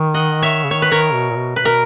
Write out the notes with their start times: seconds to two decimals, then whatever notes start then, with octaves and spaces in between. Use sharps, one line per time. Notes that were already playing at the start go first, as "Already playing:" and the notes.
Already playing: D#3
0.14 D#5 F#5
0.42 C#5 E5
0.64 C#3
0.71 D#3 C#5
0.82 B4
0.91 D#3 A#4 C#5
1.13 B2
1.30 A#2
1.35 B2
1.56 B2 B4
1.65 A#4